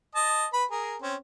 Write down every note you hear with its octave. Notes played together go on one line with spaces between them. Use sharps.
D#5 A5
B4 B5
G#4 A#4
C4 C#4